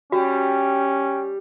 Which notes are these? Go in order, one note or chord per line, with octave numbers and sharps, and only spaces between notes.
G3 C#4 F#4 G5